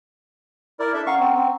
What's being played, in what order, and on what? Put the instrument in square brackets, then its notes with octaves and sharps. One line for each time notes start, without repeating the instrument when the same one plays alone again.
[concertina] E4 A#4 D5
D4 A4 E5
[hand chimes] C#4 F#5 A#5 [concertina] F5 C#6
[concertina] C4 [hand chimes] A#5 C#6
[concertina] C4